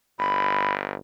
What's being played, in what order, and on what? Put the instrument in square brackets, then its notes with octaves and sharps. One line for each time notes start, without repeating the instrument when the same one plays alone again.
[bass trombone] G1 [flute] B5